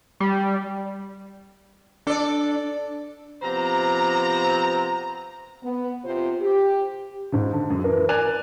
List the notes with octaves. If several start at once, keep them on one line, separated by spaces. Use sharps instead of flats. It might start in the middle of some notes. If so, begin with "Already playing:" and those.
G3
D4 A4 D5
C3 F3 B3 C5 A#5
B3
C3 F4 C5
G4
G#2 C#3
D3
F#2 F#3
E3 A#4
A#4 D5 G#5 F#6 F7